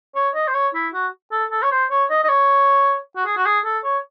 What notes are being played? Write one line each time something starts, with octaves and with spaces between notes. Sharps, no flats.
C#5
D#5
C5
C#5
E4
F#4
A4
A4
C#5
C5
C#5
D#5
D#5
C#5
F#4
G#4
F#4
G#4
A4
C#5